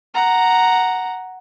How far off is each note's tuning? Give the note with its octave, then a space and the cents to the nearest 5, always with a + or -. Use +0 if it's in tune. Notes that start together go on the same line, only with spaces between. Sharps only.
F#5 +0 A#5 +0